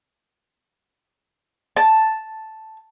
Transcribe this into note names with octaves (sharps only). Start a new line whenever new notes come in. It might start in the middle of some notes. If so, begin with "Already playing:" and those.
A5